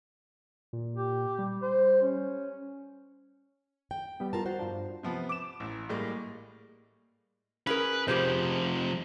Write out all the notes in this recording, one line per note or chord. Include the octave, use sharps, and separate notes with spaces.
A#2
G4
G3
C5
C#4
G5
G3 B3
F4 A#4 A5
F#4 C5
G2 F3 D4
C3 F3 B3
D6 E7
A1
A2 G3 G#3 A#3
C#4 G#4 A#4 B4
C3 F3 G4 G#4 C5